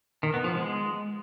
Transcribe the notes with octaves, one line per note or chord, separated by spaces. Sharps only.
D#3
B3
F3
G#3